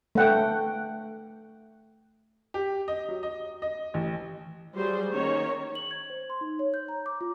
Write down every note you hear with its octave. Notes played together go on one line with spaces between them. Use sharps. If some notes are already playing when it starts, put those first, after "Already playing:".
A3 F#5 G5
G4
D#5
F#3
D#5
D#5
A1
F#3 G3 G#4 C5
D#3 A#3 C#4 C#5
F#7
G#6
C5
C6
D#4
C#5
G6
A#5
D6
F4